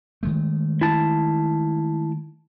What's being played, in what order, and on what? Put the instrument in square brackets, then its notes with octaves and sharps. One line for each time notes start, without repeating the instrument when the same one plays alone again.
[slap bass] D#3 G#3 A3
[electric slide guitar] E4 A5